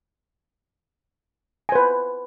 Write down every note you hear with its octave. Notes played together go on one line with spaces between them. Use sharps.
B4 C5 G#5